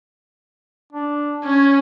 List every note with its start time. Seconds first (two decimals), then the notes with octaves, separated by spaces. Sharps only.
0.93 D4
1.44 C#4 C#5